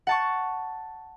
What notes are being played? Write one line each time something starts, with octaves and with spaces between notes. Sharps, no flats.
F#5 A5 C#6